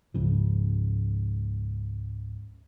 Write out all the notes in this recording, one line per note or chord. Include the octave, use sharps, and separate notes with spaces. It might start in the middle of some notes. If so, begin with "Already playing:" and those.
C#2 G#2 C#3 F3